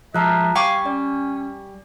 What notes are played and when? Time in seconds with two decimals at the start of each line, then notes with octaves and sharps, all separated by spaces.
0.14 F3 G#3 E5 A5 A#5 F#6
0.55 G3 F5 G5 G#5 C#6 D6
0.86 C#4 D5